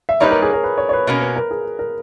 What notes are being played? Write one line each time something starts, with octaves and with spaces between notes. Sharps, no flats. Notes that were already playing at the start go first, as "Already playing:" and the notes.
E5
G3 A#3 D#4 G4 B4 C#5
A#4
G#4
A#4
B4
C#5
C#5
B4
B2 A#3 C#4
B4
A#4
G#4
A#4